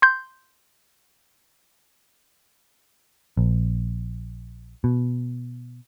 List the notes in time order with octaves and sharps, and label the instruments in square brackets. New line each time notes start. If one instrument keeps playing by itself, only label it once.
[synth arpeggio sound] C6 G6
[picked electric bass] A#1
B2